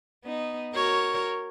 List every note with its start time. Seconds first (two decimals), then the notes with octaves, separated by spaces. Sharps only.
0.24 B3 D#4
0.74 F#4 A#4 C#5